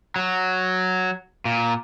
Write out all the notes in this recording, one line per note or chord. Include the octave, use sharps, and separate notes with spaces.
F#3
A#2